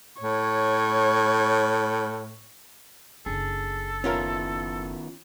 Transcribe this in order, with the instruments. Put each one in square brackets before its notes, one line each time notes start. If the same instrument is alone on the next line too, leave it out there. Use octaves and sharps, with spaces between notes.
[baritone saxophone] A2 [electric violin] C#5
[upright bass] F#1 D4 [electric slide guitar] G#4 [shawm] A4
[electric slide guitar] D#3 B3 E4 [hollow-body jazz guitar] C#4 F4 A#4